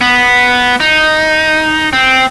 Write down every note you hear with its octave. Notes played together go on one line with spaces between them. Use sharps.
B3
D#4
C4